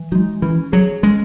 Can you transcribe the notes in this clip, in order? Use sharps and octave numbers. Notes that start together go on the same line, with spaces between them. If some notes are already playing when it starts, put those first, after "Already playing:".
Already playing: E3
F#3 G#3 D#4
E3 C#4
F#3 G#4 C#5
G#3 C#4